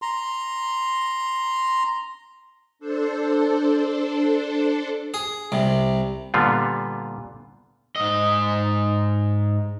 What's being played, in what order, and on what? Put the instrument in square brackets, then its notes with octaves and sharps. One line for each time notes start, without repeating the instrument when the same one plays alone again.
[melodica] A#5 C6
[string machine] D4 A4 C5
[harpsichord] G#4
C2 C3
[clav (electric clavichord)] A#2 D3 G3 B3 F4
[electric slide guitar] G#2 D#5